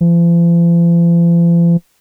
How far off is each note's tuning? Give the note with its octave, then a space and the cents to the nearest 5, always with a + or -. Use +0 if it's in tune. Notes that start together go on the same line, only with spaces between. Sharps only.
F3 -45